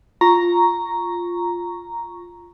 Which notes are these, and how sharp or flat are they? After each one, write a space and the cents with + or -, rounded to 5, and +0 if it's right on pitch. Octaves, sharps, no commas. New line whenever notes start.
F4 +0 A#5 +0 C#6 +0